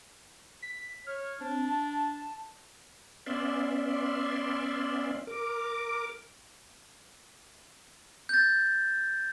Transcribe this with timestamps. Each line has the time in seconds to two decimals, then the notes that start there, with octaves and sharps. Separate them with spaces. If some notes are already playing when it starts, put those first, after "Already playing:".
0.62 B6
1.07 C#5 F6
1.40 C4 D4
1.65 A5
3.26 B3 C#4 D5 E5 C6
5.27 A#4 D6
8.29 G6 A6